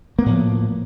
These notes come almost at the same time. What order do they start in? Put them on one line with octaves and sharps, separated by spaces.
A#3 B3 A2 F3